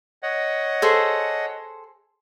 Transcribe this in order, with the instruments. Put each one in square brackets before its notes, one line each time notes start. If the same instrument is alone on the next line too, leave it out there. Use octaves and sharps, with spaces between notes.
[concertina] C#5 D#5 F#5
[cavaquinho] G#4 A4 C5